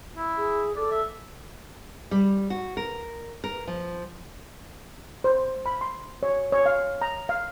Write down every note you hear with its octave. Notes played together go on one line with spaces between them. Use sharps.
E4
G#4
A4 D5
E5
G3
F#4
A#4
A#4
F3
C5
B5
C6
C#5
C#5
F5
A#5
F5